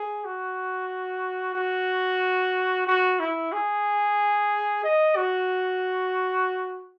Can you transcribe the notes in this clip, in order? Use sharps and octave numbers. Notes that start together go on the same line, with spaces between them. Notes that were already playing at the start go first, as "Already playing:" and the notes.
Already playing: G#4
F#4
F#4
F#4
E4
G#4
D#5
F#4